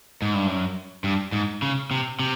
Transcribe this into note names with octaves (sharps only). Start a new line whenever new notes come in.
G#2
G2
F#2
G2
G#2
C#3
C3
C3